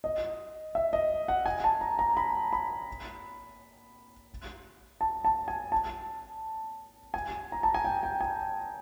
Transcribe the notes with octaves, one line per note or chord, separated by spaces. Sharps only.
D#5
E5
D#5
F#5
G#5
A5
A#5
A#5
B5
B5
A5
A5
G#5
A5
G#5
A#5
A5
G#5
G5
G5
G#5